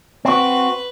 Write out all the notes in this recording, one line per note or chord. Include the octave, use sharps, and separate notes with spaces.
C4 F#4 B4